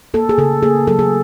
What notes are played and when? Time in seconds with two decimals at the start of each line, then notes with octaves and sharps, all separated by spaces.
0.14 A#3 A4
0.29 G#4
0.38 C#3 A4
0.63 A#3 G#4
0.87 F#3 A4
0.99 G#4